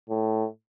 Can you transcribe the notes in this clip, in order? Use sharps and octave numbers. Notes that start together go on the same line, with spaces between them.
A2